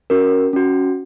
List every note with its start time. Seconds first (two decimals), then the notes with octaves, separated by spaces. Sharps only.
0.10 C#4 F#4 A#4
0.53 C#4 F#4